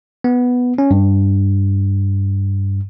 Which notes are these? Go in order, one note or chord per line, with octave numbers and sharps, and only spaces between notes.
B3
C#4
G2